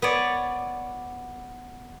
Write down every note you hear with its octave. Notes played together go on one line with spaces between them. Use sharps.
B3 C#5 D5